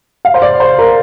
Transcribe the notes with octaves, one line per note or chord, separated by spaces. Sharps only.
F5
C5
D5
C5
A#4